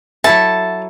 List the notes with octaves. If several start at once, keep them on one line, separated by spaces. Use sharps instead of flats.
F#3 E4 A4 E5 A5